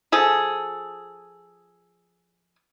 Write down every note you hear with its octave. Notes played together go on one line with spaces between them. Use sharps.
F3 G#4 A4